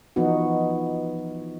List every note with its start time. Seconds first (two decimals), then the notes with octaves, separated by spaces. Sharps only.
0.16 E3 F3 B3 D#4 F#4